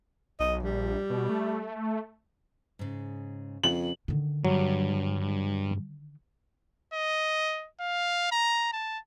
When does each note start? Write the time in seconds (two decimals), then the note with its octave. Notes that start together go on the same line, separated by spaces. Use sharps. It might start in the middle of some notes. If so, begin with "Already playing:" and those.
0.40 B1 D#5
0.63 A#1 G3
1.10 B2
1.29 A3
2.79 G#2 C#3
3.63 F2 C#3 F#7
4.08 D3 D#3
4.45 G2 F#3
6.94 D#5
7.80 F5
8.32 A#5
8.73 A5